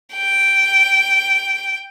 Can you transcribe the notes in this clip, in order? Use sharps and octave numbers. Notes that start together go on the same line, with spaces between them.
G5